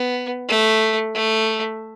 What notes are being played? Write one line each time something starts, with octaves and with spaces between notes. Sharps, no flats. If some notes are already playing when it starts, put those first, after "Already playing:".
Already playing: B3
A3
A3